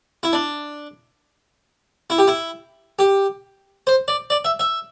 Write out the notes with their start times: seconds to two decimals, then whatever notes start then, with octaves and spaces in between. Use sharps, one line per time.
0.23 E4
0.33 D4
2.10 E4
2.18 G4
2.28 E4
2.99 G4
3.87 C5
4.08 D5
4.30 D5
4.45 E5
4.60 E5